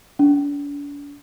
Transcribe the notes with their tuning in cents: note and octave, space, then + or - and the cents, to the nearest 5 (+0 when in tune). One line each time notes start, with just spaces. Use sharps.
D4 -40